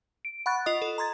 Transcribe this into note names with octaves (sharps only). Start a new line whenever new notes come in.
D7
F#5 B5 C#6 F#6 A6
F4 D#5 D#6
A4
A#5 C6 G#6 A6